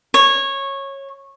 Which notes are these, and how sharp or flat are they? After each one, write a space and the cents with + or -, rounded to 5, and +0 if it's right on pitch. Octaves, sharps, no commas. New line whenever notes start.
C#5 -15